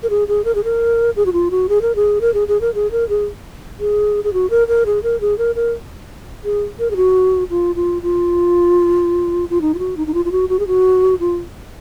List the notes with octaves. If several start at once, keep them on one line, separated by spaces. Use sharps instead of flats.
A#4
G#4
G#4
A#4
G#4
A#4
G#4
F#4
F4
F#4
G#4
A#4
G#4
A#4
G#4
G#4
A#4
G#4
A#4
G#4
G#4
G#4
F#4
A#4
A#4
G#4
A#4
G#4
A#4
A#4
G#4
A#4
G#4
F#4
F4
F4
F4
F4
D#4
F4
F#4
D#4
D#4
F4
F4
F#4
F#4
G#4
F#4
F4